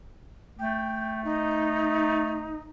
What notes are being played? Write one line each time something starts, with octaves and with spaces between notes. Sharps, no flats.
A3 G5
D#4